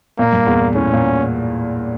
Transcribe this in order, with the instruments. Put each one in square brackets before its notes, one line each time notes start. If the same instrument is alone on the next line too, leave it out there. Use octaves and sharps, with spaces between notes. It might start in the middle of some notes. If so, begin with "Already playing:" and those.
[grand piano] A#2 [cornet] A#3
[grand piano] G2
E2
[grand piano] A2 [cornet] C#4
[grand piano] A#2